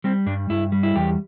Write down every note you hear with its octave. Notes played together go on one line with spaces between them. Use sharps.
G3 C4
G2 D4
G2 E4
G3
E4
E2 G4